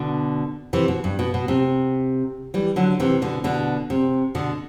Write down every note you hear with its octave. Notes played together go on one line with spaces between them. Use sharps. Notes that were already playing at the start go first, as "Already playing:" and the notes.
Already playing: B2 D3
C3 E3
B2
G2
B2
B2
C3
E3 G3
D3 F#3
C3 E3
B2 D3
B2 D3
C3
B2 D3